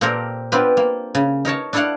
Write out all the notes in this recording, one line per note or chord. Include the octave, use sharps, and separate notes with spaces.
A#2 A#3 C4 G4 A4 A#4
B3 C4 D4 F4 G4 B4
A#3
C#3
D#4 A#4 C#5 A5
D4 E4 A4 D5 F5 F#5